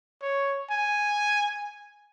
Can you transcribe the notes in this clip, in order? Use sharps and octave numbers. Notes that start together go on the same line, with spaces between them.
C#5
G#5